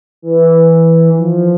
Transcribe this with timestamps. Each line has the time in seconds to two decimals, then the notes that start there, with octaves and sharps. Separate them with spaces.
0.22 E3
1.19 F3